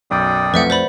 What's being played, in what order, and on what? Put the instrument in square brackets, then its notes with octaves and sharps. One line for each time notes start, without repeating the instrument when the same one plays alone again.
[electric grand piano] B1 F#2 [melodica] D5 G5 D#6
[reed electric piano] F2 A3 [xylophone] B4 E5 F#5
[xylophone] C5 D5 B5